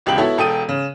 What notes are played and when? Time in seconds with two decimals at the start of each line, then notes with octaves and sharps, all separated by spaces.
0.06 E1 C#2 G4 G5 F#7
0.18 B3 E4 F#4 A4 C#5
0.38 E1 A4 G5 D#6 D#7
0.69 C#3